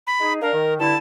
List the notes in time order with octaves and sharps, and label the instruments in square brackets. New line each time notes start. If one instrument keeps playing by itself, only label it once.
[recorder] B5
[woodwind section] D#4 G#4
[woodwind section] D4 F5 [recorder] A#4
[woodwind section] D#3
[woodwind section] G2 D3 E4 [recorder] A5